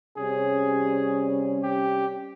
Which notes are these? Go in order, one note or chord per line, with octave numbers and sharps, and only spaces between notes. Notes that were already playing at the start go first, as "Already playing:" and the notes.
C3 G3 C#4 G#4
G4